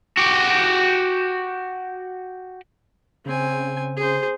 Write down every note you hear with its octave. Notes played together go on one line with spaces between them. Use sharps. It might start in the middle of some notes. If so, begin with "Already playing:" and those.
F#4 G4
C#3 C4 G#5
G#4 C5